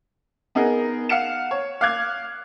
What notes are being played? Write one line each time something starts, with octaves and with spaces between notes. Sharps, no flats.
B3 D#4 G#4 A#4
F5 F#5 C#7 E7
C#5
F5 D6 F#6 G#6